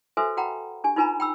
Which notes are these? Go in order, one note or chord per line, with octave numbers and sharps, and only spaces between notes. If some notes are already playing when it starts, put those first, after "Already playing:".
F#4 A4 B4 C5 E5 G#5
F#4 F#5 G5 A#5 B5
D4 G4 G#5
D#4 F4 B4 G#5 A#5 B5
G5 B5 E6